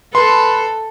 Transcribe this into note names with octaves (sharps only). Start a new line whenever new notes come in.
A4 B4 C6